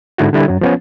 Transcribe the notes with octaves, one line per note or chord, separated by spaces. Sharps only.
G#2 D3 E4 F#4
D3 G3 E4
F#2 F#3
F3 B3 C#4